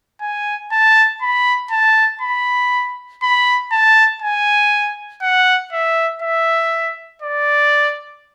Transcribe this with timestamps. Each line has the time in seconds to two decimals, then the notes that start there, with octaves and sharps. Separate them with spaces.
0.21 G#5
0.72 A5
1.22 B5
1.71 A5
2.22 B5
3.22 B5
3.72 A5
4.22 G#5
5.22 F#5
5.73 E5
6.22 E5
7.22 D5